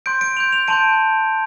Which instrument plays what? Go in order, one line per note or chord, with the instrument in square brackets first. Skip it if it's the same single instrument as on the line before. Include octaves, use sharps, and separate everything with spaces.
[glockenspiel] C6 G6 D7
D7
C6 G6 F7
F7
A5 C6 G6 D7